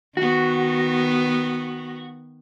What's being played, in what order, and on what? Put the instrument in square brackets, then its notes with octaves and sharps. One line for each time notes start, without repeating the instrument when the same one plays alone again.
[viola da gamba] D#3 B3 [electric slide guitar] F#4